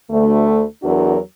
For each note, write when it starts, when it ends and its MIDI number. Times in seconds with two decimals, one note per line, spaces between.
0.10 0.62 38
0.10 0.62 57
0.83 1.18 40
0.83 1.18 54
0.83 1.18 62
0.83 1.18 66
0.83 1.18 70